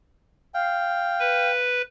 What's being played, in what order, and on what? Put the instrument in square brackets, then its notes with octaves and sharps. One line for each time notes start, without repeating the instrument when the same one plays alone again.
[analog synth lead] F5 [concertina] G5
[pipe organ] B4